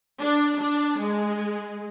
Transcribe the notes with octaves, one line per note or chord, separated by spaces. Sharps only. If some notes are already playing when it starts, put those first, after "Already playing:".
D4
D4
G#3